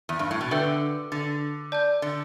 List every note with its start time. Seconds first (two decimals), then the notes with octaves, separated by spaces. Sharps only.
0.09 E2
0.19 G2
0.31 A2
0.41 B2
0.51 D3 B4 E5 G5 E6 G6
1.12 D3
1.72 D5 A5 G6
2.02 D3